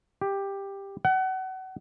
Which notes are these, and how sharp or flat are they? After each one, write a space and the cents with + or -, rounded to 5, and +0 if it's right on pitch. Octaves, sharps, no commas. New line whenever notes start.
G4 +10
F#5 +30